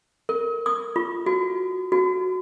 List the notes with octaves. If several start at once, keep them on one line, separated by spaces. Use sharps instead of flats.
A#4
D#6
F4
F#4
F#4